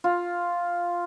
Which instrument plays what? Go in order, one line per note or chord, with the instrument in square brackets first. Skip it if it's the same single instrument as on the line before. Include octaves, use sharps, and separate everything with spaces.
[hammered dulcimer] F4